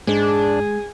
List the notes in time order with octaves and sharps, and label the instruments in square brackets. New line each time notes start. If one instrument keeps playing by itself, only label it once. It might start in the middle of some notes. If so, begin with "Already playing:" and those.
[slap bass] G#2 [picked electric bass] G#3 [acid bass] D4 [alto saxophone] G#4